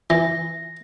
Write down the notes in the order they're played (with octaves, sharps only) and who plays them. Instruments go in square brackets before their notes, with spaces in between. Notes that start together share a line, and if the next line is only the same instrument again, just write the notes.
[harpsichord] E3 [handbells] A#6